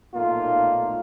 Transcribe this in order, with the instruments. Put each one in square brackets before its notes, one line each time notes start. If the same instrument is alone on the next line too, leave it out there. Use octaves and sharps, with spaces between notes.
[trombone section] B1 A#2 A3 A#3 D#4 F4